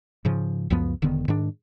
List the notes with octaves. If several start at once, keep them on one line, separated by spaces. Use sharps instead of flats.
G#2 C#3 F3
C#2 F#2 F3 B3
E1 D3 D#3 B3
G#2 D#3 D4